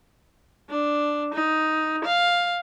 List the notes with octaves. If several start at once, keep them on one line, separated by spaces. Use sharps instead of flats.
D4
D#4
F5